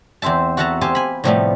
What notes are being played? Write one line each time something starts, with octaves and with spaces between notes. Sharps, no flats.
E2 C4 C5 E5 A5
F#4 A4 E5 F#5 A5 A#5
G4 A4 C5 F5 G#5
G#5 B5
A2 C3 F3 G3 A3 B3